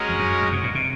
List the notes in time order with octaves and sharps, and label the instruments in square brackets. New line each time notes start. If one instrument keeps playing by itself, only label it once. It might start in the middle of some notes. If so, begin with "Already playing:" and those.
Already playing: [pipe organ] G#3 C#4 F#4 A#4 D#5
[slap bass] F2
F#2
F#2
C3
A#2
C3